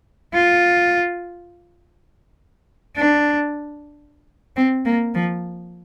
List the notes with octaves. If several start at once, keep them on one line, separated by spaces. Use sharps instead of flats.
F4
D4
C4
A#3
F3